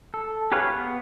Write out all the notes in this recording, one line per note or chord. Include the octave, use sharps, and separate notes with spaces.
A4
G4 G#4 B4 C#5 F5
B3